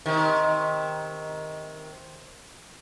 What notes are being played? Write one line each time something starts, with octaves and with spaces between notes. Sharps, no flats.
C3 D#3